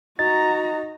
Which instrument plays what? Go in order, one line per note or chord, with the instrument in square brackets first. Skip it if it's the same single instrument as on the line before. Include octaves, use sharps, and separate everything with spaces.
[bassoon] D#4 [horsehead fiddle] F#4 A#5 [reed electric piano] A6